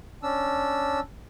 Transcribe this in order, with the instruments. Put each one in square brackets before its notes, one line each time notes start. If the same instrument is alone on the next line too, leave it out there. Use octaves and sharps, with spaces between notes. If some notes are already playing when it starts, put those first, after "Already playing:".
[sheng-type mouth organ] C#4 D4 E6